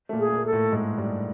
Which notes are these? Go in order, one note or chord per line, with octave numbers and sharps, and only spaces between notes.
A3
A#2 A#3
G#4
A3
A#2 A#3
A4
A2 A3
G#2 G#3
G2 G3